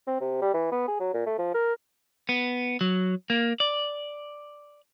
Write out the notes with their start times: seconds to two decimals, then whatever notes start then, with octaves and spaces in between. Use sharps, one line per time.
0.07 C4
0.21 C3
0.42 G3
0.54 E3
0.72 B3
0.88 G#4
1.00 F#3
1.14 A#2
1.26 A3
1.39 F3
1.55 A#4
2.29 B3
2.81 F#3
3.30 A#3
3.60 D5